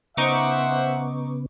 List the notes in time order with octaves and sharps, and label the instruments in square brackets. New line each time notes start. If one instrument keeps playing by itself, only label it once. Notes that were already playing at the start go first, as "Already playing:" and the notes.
[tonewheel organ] C#3 B3 [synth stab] D#4 C#6 D6 [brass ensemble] C5 E5 F#5